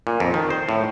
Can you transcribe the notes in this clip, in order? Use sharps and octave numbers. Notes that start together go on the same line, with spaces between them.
A#2
F2
D#3
C5
A2